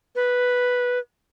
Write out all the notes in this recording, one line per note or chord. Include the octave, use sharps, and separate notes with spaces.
B4